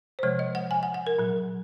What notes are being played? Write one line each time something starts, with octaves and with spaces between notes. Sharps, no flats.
C5
C3 F3 G#3 C#5
D#5
F#5
G#5
F#5
F#5
A#4
A#2 F#3